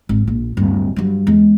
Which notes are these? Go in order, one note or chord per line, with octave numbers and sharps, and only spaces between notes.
G#1
A#1
D1 G2
G2 F#3
E2 G#3